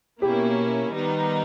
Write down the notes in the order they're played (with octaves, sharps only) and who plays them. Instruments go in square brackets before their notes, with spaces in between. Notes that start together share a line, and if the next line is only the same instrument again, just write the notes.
[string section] B2 A#3 C#4 E4 [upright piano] G4
[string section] D#3 G3 B3 D#4